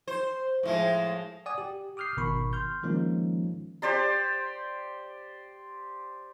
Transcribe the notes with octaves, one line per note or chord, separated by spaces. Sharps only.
C5
A2 F3 G#3
D5 F#5 G#5 D#6
G4
D6 D#6 F6 G6 C7
G#1 B2 D#3 A#4 B5 C#6
C6 F6 G6
D#3 F3 G#3 A#3 C#4 D#4
G4 C5 D5 C6